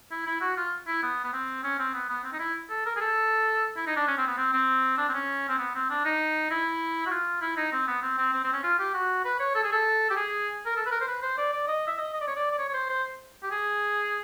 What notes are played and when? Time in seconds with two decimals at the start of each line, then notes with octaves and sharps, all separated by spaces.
0.11 E4
0.27 E4
0.41 F#4
0.57 F4
0.87 E4
1.03 B3
1.24 B3
1.33 C4
1.64 C#4
1.79 C4
1.93 B3
2.09 B3
2.24 C4
2.33 D#4
2.39 E4
2.70 A4
2.86 A#4
2.96 G#4
3.01 A4
3.77 E4
3.87 D#4
3.96 D4
4.08 C#4
4.18 C4
4.27 B3
4.37 C4
4.53 C4
4.98 D4
5.09 C4
5.14 C#4
5.49 C4
5.59 B3
5.75 C4
5.90 D4
6.05 D#4
6.51 E4
7.06 F#4
7.11 F4
7.42 E4
7.57 D#4
7.72 C4
7.87 B3
8.02 C4
8.18 C4
8.33 C4
8.44 C4
8.53 C#4
8.63 F4
8.79 G4
8.94 F#4
9.25 B4
9.40 C#5
9.55 A4
9.64 G#4
9.72 A4
10.10 G4
10.16 G#4
10.66 A#4
10.76 A4
10.86 B4
10.91 A#4
11.01 C5
11.07 B4
11.22 C5
11.38 D5
11.53 D5
11.67 D#5
11.87 E5
11.98 D#5
12.14 D#5
12.21 D5
12.27 C#5
12.36 D5
12.51 D5
12.58 C#5
12.69 C#5
12.74 C5
12.89 C5
13.43 G4
13.51 G#4